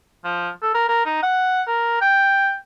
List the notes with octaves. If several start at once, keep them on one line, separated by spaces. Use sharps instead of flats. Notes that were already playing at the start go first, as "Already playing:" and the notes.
F3
A4
A#4
A#4
D#4
F#5
A#4
G5